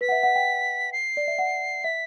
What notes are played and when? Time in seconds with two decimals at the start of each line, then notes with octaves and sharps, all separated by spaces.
0.01 B4 B6
0.09 F#5
0.12 E5
0.23 F#5
0.35 G5
0.92 C7
1.17 D5
1.28 E5
1.38 F#5
1.84 E5 B6